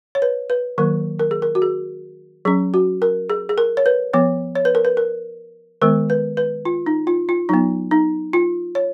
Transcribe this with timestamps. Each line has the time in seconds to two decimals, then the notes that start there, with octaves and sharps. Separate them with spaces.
0.15 C#5
0.22 B4
0.50 B4
0.78 D#3 F#3 A#3 A#4
1.19 A#4
1.31 G#4
1.42 A#4
1.55 F#4
1.62 G#4
2.45 F#3 C#4 G#4
2.74 F#4
3.02 A#4
3.30 G#4
3.49 G#4
3.58 A#4
3.77 C#5
3.86 B4
4.14 F3 B3 C#5
4.55 C#5
4.65 B4
4.75 A#4
4.85 B4
4.97 A#4
5.82 D#3 G#3 B3 A#4
6.10 B4
6.37 B4
6.65 F4
6.86 D#4
7.07 F4
7.29 F4
7.49 F#3 B3 D#4
7.91 D#4
8.33 F4
8.75 C#5